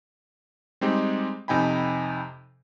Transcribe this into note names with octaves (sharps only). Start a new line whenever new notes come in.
G3 G#3 C4 D#4 G4
F2 C3 D#4 G5 G#5 B5